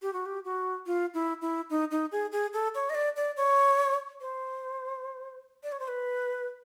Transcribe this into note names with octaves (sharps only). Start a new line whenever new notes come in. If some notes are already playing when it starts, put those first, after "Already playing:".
G4
F#4
G4
F#4
F4
E4
E4
D#4
D#4
G#4
G#4
A4
C#5
D#5
D5
D5
C#5
C5
D5
C#5
C5
B4